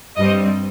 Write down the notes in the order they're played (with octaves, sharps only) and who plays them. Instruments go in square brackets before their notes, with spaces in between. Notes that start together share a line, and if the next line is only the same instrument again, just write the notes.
[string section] G2 G3 C4 D#5